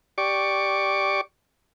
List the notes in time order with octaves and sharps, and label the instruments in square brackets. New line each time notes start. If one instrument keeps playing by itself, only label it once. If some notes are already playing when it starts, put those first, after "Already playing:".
[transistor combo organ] G4 D5 C#6 D6